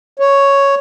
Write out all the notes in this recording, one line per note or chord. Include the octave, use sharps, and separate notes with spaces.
C#5